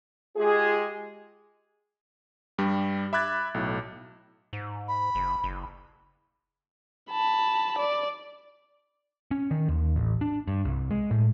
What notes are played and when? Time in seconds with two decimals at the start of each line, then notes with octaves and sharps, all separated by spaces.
0.37 G#3 F4 G4 G#4
2.58 G2 G3
3.13 E5 B5 D6 F#6 G#6 A6
3.54 B1 A2
4.53 G#2
4.88 B5
5.15 F#1
5.44 F#1
7.11 A5 B5
7.79 D5
9.31 C#4
9.51 D#3
9.68 D#2
9.96 A1
10.21 D4
10.48 G2
10.65 C2
10.91 G#3
11.11 A2